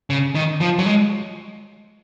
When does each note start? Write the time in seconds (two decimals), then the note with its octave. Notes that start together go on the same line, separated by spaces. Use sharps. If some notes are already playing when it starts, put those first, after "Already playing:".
0.10 C#3
0.35 D#3
0.61 F3
0.79 F#3
0.86 G#3